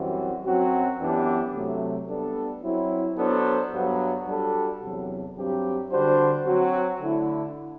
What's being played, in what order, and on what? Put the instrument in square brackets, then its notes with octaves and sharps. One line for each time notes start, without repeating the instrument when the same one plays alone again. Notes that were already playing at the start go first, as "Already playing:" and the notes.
Already playing: [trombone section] F#2 E3 G3 C4 F#4
F#2 F#3 C4 F#4
F#2 E3 B3 D4 G4
C3 F#3 A3
G3 B3 D4 A4
F#3 C4 E4
F#3 B3 D4 A4 C5
G2 F#3 B3
G3 D4 F#4 A4
E2 C3 F#3
G2 F#3 C4 G4
D3 G3 D4 F#4 C5
F#3 C4 F#4
D3 A3 E4